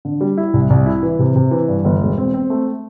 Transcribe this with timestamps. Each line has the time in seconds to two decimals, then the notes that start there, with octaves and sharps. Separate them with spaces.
0.05 D3
0.21 G3
0.38 E4
0.54 C2
0.70 C2
0.86 E4
1.03 E3
1.19 C3
1.36 C3
1.51 E3
1.68 G2
1.85 G1
2.01 E1
2.18 C4
2.34 C4
2.50 A3